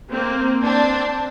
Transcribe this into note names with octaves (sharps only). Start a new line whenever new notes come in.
A#3 C4
C4 D4